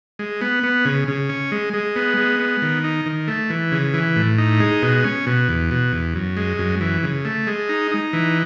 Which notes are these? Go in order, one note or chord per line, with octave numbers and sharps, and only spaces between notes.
G#3
B3
B3
C#3
C#3
C#4
G#3
G#3
B3
G#3
B3
D#3
D#4
D#3
A3
E3
C#3
E3
A2
D#4
G#3
B2
C#4
B2
E2
B2
E2
F#2
G#3
F#2
E3
C#3
A3
G#3
D#4
D#4
E3